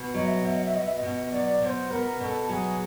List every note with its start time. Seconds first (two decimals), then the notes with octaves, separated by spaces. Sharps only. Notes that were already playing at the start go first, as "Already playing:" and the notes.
Already playing: B2
0.14 F#3 D#5
0.25 E5
0.35 D#5
0.44 B2 E5
0.55 D#5
0.64 E5
0.74 B3 D#5
0.85 E5
0.95 D#5
1.03 B2
1.32 F#3 D5
1.61 B2 C5 D5
1.91 B3 A#4
2.20 B2 A4 A#4
2.49 F#3 G#4